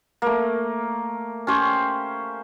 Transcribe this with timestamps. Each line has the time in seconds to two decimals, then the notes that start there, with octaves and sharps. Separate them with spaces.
0.22 A3 A#3
1.47 C#4 G4 C5 C#5